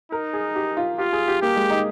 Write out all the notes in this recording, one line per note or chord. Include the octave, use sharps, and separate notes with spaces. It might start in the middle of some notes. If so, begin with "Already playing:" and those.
D#4 A#4
G#4
G4
F4
F4 G4
G#4
G4
A#3 G4
G#3
D#4